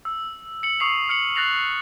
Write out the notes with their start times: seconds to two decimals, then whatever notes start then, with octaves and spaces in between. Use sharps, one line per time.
0.05 E6
0.63 C#7 F#7
0.80 C#6 D#6 C7 F7
1.09 F6 C#7 F#7
1.35 F#6 A6 A#6 C7 F7 F#7